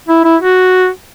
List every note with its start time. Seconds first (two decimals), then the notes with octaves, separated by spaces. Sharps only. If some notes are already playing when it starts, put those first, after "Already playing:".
0.08 E4
0.25 E4
0.41 F#4